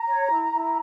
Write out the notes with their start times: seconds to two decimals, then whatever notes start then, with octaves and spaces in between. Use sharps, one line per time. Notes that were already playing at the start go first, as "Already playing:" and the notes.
Already playing: A#5
0.09 C#5
0.31 E4
0.53 E4